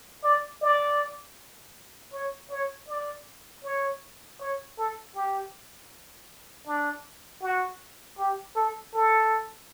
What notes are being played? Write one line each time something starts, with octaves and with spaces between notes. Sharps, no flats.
D5
D5
C#5
C#5
D5
C#5
C#5
A4
G4
D4
F#4
G4
A4
A4